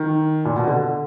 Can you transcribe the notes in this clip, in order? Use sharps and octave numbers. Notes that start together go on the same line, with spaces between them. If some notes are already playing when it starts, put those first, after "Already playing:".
Already playing: D#3
A#2
B2
D3